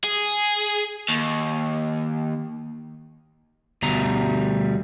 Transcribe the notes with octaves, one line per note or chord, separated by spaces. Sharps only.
G#4
D#2
D2 B2 G3 A#5